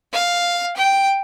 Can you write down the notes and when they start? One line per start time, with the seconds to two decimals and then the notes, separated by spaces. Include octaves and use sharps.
0.13 F5
0.77 G5